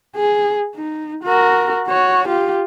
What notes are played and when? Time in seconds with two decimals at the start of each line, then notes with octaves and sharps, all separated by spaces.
0.16 G#4
0.76 D#4
1.24 F#4 A#4
1.88 F#4 C#5
2.28 F4 G4